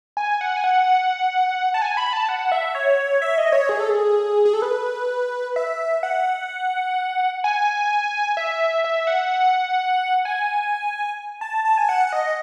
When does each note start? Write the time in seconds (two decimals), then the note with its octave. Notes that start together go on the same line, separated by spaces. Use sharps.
0.17 G#5
0.41 F#5
0.56 G#5
0.64 F#5
1.74 A5
1.82 G#5
1.97 B5
2.13 A5
2.29 F#5
2.52 E5
2.75 C#5
3.22 E5
3.38 D#5
3.52 C#5
3.69 G#4
3.80 A4
3.90 G#4
4.45 G#4
4.53 A4
4.62 B4
5.56 E5
6.03 F#5
7.44 G#5
8.37 E5
8.84 E5
9.07 F#5
10.25 G#5
11.41 A5
11.65 A5
11.78 G#5
11.89 F#5
12.13 D#5